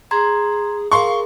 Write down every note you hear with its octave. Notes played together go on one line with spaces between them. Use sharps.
G#4 A#5 C6 G#6
G#4 A#4 F5 C6 C#6